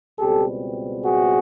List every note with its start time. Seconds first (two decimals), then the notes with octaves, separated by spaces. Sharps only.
0.19 C#2 B2 G3 C4 G4 A4
1.05 F#4 G#4